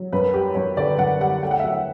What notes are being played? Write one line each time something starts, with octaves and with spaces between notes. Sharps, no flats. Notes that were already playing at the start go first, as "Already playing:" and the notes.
Already playing: F#3
F#2 B4
G3 G4
F#2 C#5
D3 D5
F#2 F#5
G3 F#5
A3 G5
F#5
E5
F#3 F#5